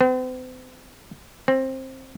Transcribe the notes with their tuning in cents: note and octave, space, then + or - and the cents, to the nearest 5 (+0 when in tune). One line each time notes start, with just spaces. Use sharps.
C4 -45
C4 +15